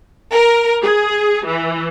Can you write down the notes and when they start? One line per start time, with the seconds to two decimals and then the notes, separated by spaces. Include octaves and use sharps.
0.32 A#4
0.82 G#4
1.45 E3